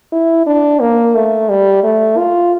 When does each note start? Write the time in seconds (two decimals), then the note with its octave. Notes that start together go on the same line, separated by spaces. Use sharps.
0.12 E4
0.47 D4
0.81 A#3
1.15 A3
1.50 G3
1.84 A3
2.17 F4